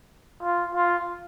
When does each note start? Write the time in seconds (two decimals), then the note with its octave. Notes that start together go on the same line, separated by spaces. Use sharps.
0.43 F4
0.75 F4